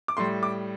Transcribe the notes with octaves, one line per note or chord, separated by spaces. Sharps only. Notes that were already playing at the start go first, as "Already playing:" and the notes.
D6
A2 G3 C6
D6